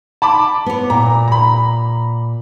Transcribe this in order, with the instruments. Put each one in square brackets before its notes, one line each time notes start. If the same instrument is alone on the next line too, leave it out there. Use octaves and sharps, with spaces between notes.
[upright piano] A5 B5 D6
[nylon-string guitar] B3 C#5
[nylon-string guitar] A#2 [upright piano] A#5
[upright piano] A#5 B5